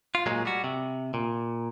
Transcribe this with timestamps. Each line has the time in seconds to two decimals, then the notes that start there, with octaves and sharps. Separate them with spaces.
0.15 F4
0.26 A#2 F#3 G#3
0.45 G3 F#4
0.64 C3
1.14 A#2